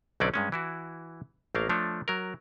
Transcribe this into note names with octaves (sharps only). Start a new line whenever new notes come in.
B1 D3 F#3 C4 C#4 D5
G2 G#3 C#4
E3 E4 F#4
A1 A3 A#3 A#4 F5
F3 A3 D4 C#5
F#3 A#4